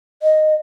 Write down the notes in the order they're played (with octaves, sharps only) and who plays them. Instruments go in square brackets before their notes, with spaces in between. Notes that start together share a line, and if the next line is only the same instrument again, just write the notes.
[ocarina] D#5